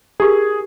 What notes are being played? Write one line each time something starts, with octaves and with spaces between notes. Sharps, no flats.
E4 G4 G#4 A#4